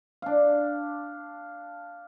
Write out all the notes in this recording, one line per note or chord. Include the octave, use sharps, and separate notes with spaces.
D4 F5